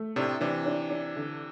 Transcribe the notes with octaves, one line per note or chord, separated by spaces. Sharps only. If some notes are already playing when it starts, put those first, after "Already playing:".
Already playing: A3
A2 C3 D4
C3 E3 D4
D4
D4
D3